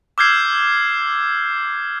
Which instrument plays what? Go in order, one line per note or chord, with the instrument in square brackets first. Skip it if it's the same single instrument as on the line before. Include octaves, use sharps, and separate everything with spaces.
[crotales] D6 E6 F6 G6 G#6 C7